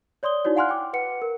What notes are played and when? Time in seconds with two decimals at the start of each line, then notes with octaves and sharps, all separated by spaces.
0.23 C#5 D5 C6 D#6 G7
0.44 D#4 E4 F#4 C#5 D5
0.56 F5 F#5 G#5 C6 F6 F#6
0.69 G5 D6
0.93 B4 F#5 C#7
1.22 A#4